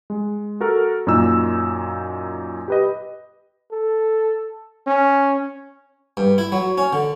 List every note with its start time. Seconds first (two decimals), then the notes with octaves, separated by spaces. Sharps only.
0.10 G#3
0.61 F#4 A4 A#4
1.07 F#2 A#2 A#3 D#4 E6
2.68 G4 B4 D#5
3.71 A4
4.87 C#4
6.17 G2
6.38 E4
6.52 F#3
6.78 C#4
6.93 D3